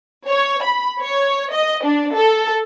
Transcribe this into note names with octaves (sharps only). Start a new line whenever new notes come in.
C#5
B5
C#5
D#5
D4
A4